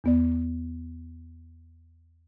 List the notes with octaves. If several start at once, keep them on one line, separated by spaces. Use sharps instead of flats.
E2 B3 D5